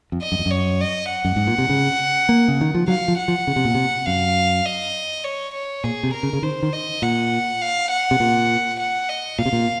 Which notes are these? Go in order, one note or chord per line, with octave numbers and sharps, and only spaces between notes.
F2
D#5
F#2
F2
F#2
C#5
D#5
F#5
F#2
G#2
A#2
C3
C#3
A#3
C#3
D#3
F3
F#3 F5
F3
F#5
F3
C#3
C3
A#2
C3
F#2 F5
D#5
C#5
C#5
A#2 G#4
C3
A#4
C#3
C#3
D#3 C5
D#3
D#5
A#2 F#5
F5
F#5
C3
A#2
F#5
D#5
A#2 F5
C3
A#2